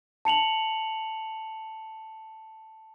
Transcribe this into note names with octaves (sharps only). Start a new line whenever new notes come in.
A5 C#7 F7 F#7